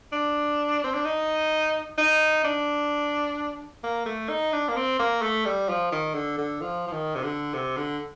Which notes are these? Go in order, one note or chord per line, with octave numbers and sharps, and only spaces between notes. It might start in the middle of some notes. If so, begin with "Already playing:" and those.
D4
C4
D4
D#4
D#4
D4
A#3
A3
D#4
D4
A#3
C4
A#3
A3
G3
F3
D#3
D3
D3
F3
F3
D#3
C3
D3
C3
D3